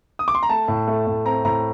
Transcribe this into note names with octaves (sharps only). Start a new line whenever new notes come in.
D#6
D6
C6
A#5
A3 A5
A2
A3
A2
C4 A#5
A2 A#5